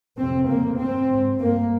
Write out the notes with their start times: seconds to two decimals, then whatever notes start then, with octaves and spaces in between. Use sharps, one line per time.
0.18 F2 C3 C4
0.48 F2 C#3 A#3
0.78 G2 C4
1.09 G#2
1.39 G2 A#3